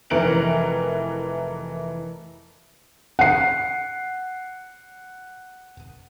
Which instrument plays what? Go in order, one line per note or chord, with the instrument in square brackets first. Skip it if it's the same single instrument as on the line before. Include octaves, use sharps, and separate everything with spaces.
[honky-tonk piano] F1 E3 A#4 D7 F#7
[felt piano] F#5 C7